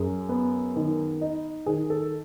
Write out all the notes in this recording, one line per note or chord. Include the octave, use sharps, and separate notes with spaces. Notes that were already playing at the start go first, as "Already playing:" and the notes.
Already playing: F#2 G#4
B3
D#3
D#4
D#3 G#4
A4